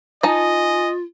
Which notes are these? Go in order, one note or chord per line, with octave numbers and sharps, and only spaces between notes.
D#4 F4 D#5 G#5 A5